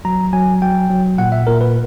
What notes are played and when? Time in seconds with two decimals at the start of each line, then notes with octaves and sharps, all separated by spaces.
0.05 F#3 A#5
0.33 F#3 G#5
0.62 F#3 G5
0.90 F#3
1.18 A#2 F#5
1.32 E5
1.47 A#2 A#4
1.61 B4